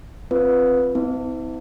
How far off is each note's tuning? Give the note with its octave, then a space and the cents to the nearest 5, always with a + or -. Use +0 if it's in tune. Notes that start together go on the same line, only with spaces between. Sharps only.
C4 +0 F4 -10 B4 +0
C4 -45 E4 -40